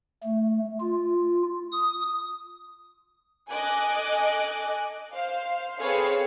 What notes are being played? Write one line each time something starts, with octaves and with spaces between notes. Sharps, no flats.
A3
F4
D#6
A4 D#5 G#5 D6 F#6
C5 F5
C4 G#4 A4 B4 C#5 F5